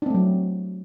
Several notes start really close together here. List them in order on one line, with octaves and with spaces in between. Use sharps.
D4 C4 A3 F#3